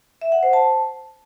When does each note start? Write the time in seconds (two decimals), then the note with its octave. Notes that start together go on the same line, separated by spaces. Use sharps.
0.21 E5
0.32 F#5
0.43 C5
0.53 A5